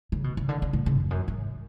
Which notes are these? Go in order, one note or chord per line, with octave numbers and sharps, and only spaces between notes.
C#3
B2
C#3
D3
C#3
A2
C#3
F2
F#2
G#2